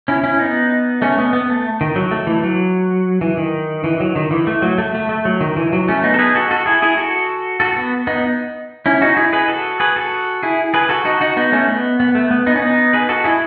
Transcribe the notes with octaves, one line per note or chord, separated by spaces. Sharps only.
C#4 E4
C#4 E4
B3 D#4
A3 C#4
B3
B3
A3
D#3
F#3
A3
E3
F#3
E3
D#3
E3
F#3
D#3
E3
A3
F#3
A3
A3
A3
F#3
D#3
E3
F#3
A3 C#4
B3 D#4
A4
G#4 B4
F#4 A4
F#4 A4
E4 G#4
E4 G#4
F#4 A4
F#4 A4
B3
B3 D#4
C#4 E4
D#4 F#4
E4 G#4
G#4 B4
F#4 A4
G#4 B4
F#4 A4
E4 G#4
G#4 B4
F#4 A4
D#4 F#4
D#4 F#4
B3 D#4
A3 C#4
B3
B3
A3
B3
B3 D#4
C#4
B3 D#4
G#4 B4
F#4 A4
E4 G#4